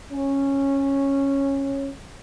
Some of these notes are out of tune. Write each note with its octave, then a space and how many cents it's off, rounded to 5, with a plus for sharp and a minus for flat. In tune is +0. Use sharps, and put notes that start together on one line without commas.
C#4 -10